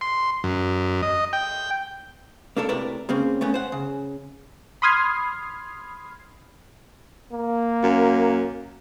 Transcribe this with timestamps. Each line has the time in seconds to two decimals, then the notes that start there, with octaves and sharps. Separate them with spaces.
0.01 C6
0.44 F#2
1.02 D#5
1.33 G5
2.57 A#3 D4 A4 A#4
2.69 A2 C3 A#4 B4 D5
3.09 C#3 A#3 C4 C#4
3.41 A3 B3 C#4
3.54 C5 F#5
3.72 C#3
4.82 B5 C6 D#6 F6 G#6 C7
7.32 A#3
7.83 F#2